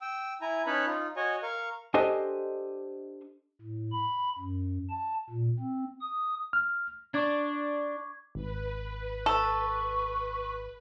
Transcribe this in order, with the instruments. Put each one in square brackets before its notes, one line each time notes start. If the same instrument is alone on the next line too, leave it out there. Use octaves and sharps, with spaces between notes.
[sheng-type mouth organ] G5 E6
E4 G#5 A#5
C#4 D#4 B4 C#5 A5 B5
D#4 F4
F#4 C#5 D#5 G#5
A#4 F5 C#6
[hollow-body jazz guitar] D4 G4 A4 C5 D#5 G#5
[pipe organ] A2
B5
F#2
A5
A#2
C4
D#6
[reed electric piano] F6
[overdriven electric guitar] D4 [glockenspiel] C#6 D6 G#6
[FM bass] G#1 [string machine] B4
[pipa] A4 [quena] C#6